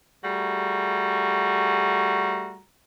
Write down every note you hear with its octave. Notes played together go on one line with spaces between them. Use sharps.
G3 A3 F#4 G#4 A#5